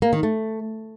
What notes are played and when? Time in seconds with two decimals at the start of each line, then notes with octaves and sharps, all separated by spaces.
0.02 A#3
0.13 D#3
0.23 A3